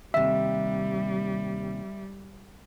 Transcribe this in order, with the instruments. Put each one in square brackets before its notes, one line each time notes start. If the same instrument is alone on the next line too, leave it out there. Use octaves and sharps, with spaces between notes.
[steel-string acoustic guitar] D#2 C3 [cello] G3 [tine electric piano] E5